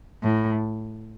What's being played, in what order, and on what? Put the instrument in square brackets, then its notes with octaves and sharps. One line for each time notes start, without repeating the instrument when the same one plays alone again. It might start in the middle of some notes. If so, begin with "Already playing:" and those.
[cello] A2